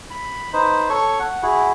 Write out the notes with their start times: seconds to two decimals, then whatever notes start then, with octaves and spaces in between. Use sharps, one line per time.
0.10 B5
0.53 D#4 B4 C5
0.89 A4 C#5 C#6
1.20 F#5
1.43 E4 F#4 G#4